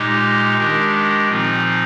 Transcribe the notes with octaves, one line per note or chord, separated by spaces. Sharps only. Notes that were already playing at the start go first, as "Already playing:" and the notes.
Already playing: A#2 G#3 D#4 G4
D#3 G#3 D4 G4
A#2 F3 C4 D#4